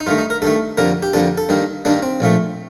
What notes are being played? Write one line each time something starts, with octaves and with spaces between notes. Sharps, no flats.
D#4
G2 D#3 A3 F4
D#4
A#4
G2 D#3 A3 A4
F2 D3 G3 A#3 A#4
G4
F2 D3 G3 A#3 A4
A4
G2 D#3 G3 A#3
G2 D#3 G3 A#3 D4
C4
A#1 A#2 F3 A3